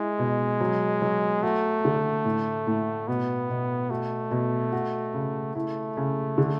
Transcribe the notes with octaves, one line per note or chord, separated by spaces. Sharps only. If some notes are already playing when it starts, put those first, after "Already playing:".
Already playing: G#3 E4
B2
F#3
F#3
A3 F#4
D3
A2
A2
B2 B3
B2
A3 F#4
B2
F#4
C#3
A3 E4
C#3
D3